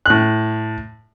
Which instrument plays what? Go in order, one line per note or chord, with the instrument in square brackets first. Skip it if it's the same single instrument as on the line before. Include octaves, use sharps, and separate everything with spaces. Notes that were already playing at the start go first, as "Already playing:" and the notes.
[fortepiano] A2 F#6